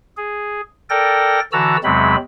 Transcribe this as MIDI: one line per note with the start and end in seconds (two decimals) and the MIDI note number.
0.17 0.61 68
0.90 1.40 69
0.90 1.40 70
0.90 1.40 74
0.90 1.40 79
0.90 1.40 94
1.52 1.77 50
1.52 1.77 52
1.52 1.77 66
1.52 1.77 81
1.52 1.77 82
1.52 1.77 88
1.83 2.16 40
1.83 2.16 48
1.83 2.16 54
1.83 2.16 56
1.83 2.16 60
1.83 2.16 83